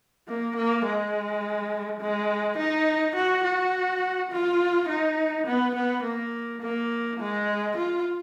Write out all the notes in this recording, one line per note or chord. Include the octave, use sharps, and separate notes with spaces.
A#3
A#3
G#3
G#3
D#4
F#4
F#4
F4
D#4
B3
B3
A#3
A#3
G#3
F4